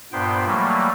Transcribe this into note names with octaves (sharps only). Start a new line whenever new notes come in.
G2 A#2 B3 C5 G5
E3 F#3 G3 A3 A#3